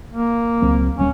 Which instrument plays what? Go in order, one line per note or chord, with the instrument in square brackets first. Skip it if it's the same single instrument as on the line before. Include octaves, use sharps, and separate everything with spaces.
[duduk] A#3
[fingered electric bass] C#2 F#3 C4
[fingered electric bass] D1 G3 [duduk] C#4